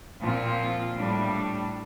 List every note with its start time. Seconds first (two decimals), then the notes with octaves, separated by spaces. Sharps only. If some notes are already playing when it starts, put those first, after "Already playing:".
0.22 A#2 F3 C4 F4
0.97 A2 G3 D4